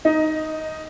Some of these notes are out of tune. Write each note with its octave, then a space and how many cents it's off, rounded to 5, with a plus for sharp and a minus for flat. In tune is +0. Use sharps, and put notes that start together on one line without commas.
D#4 +0 D#5 +15